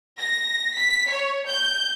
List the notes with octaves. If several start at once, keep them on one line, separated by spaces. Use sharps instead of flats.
A#6
B6
C#5
G6